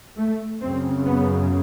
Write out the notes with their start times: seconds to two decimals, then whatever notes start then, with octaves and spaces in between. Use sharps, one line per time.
0.17 A3
0.60 F#2 C#3 C4
1.06 B3